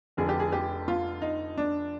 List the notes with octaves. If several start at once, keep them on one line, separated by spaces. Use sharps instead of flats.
F1 F2 D3 F3 G#4
G4
G#4
G4
F4
D#4
D4